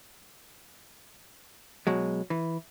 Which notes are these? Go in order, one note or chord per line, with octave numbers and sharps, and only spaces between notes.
B2 F#3 G#3
E3